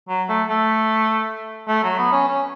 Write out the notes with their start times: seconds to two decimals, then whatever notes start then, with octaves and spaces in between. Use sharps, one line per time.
0.08 F#3
0.29 A3
0.49 A3
1.68 A3
1.83 F#3
1.98 B3
2.12 C#4
2.28 C#4